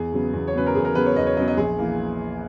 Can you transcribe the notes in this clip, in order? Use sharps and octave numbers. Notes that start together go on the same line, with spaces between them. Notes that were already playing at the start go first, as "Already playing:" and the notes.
Already playing: E2 G#4
C#3 F#3 B3
E2
C#5
C#3 F#3 B3 B4
A#4
E2 G#4
A#4
C#3 F#3 B3 B4
C#5
E2 D#5
C#5
C#3 F#3 B3 D#5
D#5
A#1 G#4
E3 A#3